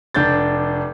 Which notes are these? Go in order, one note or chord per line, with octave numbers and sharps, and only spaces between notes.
F1 D4 G6 A6